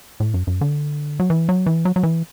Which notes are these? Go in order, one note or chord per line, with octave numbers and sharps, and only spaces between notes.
A2
F#2
F#2
D3
F#3
E3
F#3
E3
F#3
F#3
E3